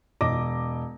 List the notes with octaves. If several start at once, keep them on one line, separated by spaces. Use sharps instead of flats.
E1 D#5 D6 A#6